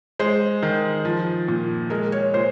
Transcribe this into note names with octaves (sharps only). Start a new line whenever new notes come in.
G#3 C5
D#3
F3
A#2
G#3 A#4
C#5
A#2 C5